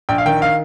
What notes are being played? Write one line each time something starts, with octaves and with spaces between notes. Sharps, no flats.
A#1 G5
F5
D#3 G5
F5